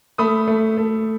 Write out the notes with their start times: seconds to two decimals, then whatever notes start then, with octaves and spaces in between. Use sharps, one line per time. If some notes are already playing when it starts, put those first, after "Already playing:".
0.18 A3 B5 D#6
0.47 A3
0.77 A3